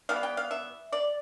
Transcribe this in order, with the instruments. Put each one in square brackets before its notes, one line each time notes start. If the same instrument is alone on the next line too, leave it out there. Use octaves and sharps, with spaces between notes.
[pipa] E3 G3 B3 F5
G5
F5
E5
D5